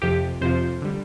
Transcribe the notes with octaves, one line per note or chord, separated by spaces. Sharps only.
F2 C3 F3 G4
F2 C3 F3 C5
D3 G3